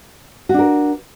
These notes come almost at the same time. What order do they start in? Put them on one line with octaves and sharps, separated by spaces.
F#4 D4 A#4